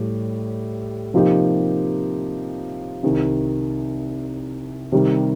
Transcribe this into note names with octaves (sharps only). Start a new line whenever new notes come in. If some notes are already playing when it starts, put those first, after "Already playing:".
Already playing: A2 G3 G4
C3 F3 A#3 D#4 G4
C2 C3 D#3
C3 D#3 G3